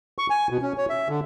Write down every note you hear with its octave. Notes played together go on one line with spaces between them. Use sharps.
C#6
G#5
B2
C#4
C#5
E5
D3